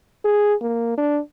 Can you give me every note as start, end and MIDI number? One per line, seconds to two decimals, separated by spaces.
0.25 0.54 68
0.61 0.94 58
0.98 1.20 62